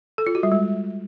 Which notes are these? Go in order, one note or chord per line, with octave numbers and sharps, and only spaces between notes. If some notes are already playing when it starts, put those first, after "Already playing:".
A4
F4
F#4
G3
G#3